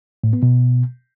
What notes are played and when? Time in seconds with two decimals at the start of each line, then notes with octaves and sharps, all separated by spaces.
0.24 A2
0.33 B3
0.43 B2